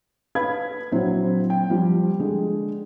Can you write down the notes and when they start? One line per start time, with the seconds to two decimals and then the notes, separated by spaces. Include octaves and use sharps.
0.35 B4 F5 B5 G#6
0.92 A#1 F#3 C4 E4 C5
1.50 G5
1.70 F3 G3
2.19 D3 G#3